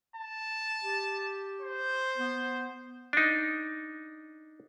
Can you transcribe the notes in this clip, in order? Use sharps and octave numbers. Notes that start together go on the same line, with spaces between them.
A5
G4
C5
B3
D4 D#4